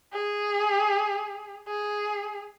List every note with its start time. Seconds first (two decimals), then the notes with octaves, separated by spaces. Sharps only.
0.13 G#4
1.68 G#4